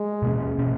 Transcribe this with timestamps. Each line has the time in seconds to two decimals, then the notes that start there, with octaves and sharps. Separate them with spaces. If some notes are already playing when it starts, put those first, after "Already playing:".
Already playing: G#3
0.22 B2 A#3 C#4
0.58 B2 A#3 C#4